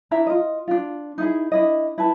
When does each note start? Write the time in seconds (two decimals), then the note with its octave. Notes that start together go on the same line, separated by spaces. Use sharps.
0.11 D4 E4 E5 A#5
0.27 F4 D#5
0.68 D4 F4
1.18 D#4 E4 G#4
1.52 D4 E4 D#5
1.98 E4 B4 A5